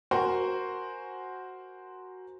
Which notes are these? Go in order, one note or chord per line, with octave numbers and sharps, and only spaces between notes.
F#4 A#4 C5 G#5 C#6